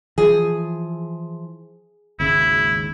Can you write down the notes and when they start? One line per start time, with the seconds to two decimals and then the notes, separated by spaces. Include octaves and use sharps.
0.18 E3 F3 G#4
2.20 G#1 D#2 C#3 E4